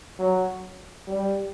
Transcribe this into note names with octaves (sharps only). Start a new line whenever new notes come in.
F#3
G3